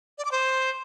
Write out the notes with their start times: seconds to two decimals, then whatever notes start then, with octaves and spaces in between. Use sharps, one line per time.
0.18 D5
0.25 D6
0.32 C5